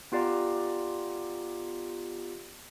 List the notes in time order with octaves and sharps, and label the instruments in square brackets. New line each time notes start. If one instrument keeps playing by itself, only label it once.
[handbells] B3 F4 G4 D5 A#5